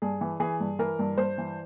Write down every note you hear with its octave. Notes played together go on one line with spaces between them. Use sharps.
G2 G#4
E3
E3 G#4
G2
E3 A#4
G2
G2 C5
E3